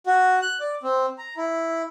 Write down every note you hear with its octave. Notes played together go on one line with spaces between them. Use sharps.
F#4
F#6
D5
C4
A#5
E4